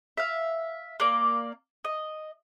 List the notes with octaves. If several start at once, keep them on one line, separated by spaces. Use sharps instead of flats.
E5 F5
A#3 D5
D#5